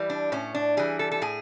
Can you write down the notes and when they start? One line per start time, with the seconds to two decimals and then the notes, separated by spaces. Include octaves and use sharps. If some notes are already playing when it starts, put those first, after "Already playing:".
Already playing: E3 G3
0.10 D4
0.32 A2 C#4
0.55 D4
0.77 E3 G3 G#4
0.99 A4
1.12 A4
1.22 A2 G#4